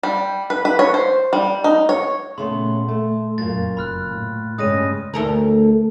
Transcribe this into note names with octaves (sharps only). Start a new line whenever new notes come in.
G3
B4
B4
C#5
C5
G3
D#4
C#5
A#2 C#3 A3 B3 C6
A3
F#2 A#2 A#3 A6
F#1 B5 F6 F#6
A2
G2 C#3 G3 G#3 C#4 D#6 A#6 D#7
D2 A4 A#4